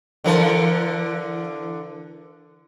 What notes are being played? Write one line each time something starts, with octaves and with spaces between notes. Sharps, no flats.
D3 E3 A#4